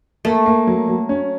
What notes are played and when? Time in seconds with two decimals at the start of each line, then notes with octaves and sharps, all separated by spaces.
0.25 A3 A#3
0.46 A#3
0.67 F#3
0.88 F#3
1.09 C#4